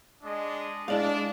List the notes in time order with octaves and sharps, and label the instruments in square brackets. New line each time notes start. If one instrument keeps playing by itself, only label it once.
[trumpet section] G#3 D4 D#5
[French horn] G#3 [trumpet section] D4 [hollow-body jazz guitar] E4 D5 F5